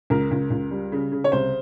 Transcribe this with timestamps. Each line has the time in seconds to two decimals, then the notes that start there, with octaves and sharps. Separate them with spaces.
0.10 C#2 A#4
0.31 C#2
0.50 C#2
0.71 G3
0.92 C#3
1.12 C#3
1.24 C#5
1.32 C2 C5